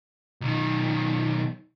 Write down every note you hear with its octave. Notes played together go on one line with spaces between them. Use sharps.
B1 D#3